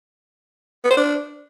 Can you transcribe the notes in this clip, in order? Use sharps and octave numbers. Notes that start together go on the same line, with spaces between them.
B3
C5
D4